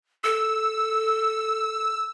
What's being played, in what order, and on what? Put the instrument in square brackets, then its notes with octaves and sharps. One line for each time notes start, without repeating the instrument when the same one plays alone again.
[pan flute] A4 [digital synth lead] E6